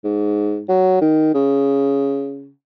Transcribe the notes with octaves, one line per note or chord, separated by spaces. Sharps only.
G#2
F#3
D#3
C#3